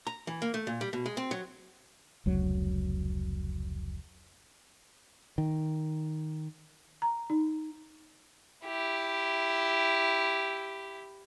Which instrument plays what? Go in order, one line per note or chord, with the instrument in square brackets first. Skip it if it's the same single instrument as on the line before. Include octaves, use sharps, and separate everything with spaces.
[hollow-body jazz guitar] A#5
E3
A#3
A3
A#2
G3
B2
G#3
C4
F#3
[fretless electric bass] F1 C#2 F#3
[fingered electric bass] D#3
[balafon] A#5
D#4
[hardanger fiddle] E4 G4